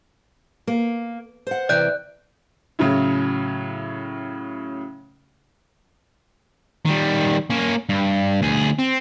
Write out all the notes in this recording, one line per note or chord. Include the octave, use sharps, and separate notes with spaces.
A#3
C5 F#5
C3 E3 D5 G5 F#6 G6
A2 C#3 F#3 C#4 E4
D#3 G3
A#3 C#4
G2
D2 G#4
C4